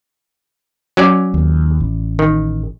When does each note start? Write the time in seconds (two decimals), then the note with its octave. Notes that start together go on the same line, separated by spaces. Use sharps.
0.97 F#3 C#4 D5
1.34 D#2
1.80 A1
2.19 D#3